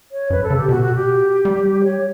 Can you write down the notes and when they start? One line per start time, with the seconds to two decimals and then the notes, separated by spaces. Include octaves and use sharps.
0.12 C#5
0.30 F#2 B4
0.43 A4
0.50 C#3
0.56 G4
0.69 B2 F#4
0.82 F#4
0.95 G4
1.45 G3
1.84 C#5